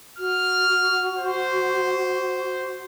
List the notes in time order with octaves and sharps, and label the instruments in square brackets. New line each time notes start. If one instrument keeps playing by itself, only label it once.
[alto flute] F#4 [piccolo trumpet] F6
[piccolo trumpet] C5